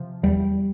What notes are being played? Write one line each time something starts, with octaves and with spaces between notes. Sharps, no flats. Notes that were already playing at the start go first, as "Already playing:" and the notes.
Already playing: C3 F3
E2 G3